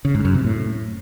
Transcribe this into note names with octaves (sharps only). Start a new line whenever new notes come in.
C#3
G#2
F#2
C3
A2